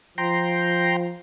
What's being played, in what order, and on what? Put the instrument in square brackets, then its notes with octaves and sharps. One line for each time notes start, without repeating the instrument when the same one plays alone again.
[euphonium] F3 [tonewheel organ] G5 A#5 C6